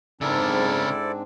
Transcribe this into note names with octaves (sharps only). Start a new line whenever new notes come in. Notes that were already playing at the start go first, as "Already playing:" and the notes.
G#2 C#3 C4 D4 E4 A4 A#4 D5